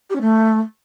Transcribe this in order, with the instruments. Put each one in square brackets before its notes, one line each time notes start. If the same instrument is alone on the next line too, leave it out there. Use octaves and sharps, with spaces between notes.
[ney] G4
C#4
A3